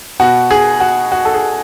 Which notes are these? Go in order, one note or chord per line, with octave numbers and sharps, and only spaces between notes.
B2 F#4
G#4
F#4
F#4
A4
G#4